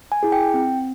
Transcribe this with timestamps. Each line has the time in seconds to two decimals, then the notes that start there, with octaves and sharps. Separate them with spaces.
0.12 G#5
0.23 E4 G#4
0.32 G5
0.54 C4